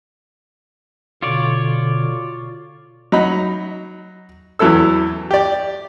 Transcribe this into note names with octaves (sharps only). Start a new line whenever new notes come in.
B2 D3 F4 C#5 D5
F#3 D#4 B5
E2 E3 F#3 E4 A4 E6
G4 D5